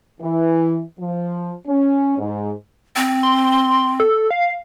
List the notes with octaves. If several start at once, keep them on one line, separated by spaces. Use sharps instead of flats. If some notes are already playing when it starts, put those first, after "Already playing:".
E3
F3
C#4
G#2
C4
C6
A4
F5